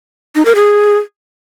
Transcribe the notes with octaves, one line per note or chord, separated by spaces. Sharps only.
D#4
A#4
G#4